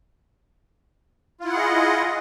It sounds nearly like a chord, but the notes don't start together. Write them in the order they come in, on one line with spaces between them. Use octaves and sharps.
F4 E4 F#5 G#4 D#5